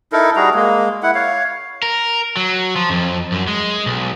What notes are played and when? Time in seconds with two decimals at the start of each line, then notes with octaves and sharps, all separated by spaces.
0.12 D#4 E4 A4 A#4
0.36 G3 F#4 G#4 A#5
0.54 G#3 A#3
1.03 E4 F#5
1.15 C#5 F5
1.82 A#4
2.37 F#3
2.76 F3
2.90 F2
3.32 F#2
3.48 G#3
3.86 B1